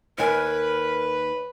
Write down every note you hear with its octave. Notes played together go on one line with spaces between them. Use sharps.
D#2 A#4 B4 G#5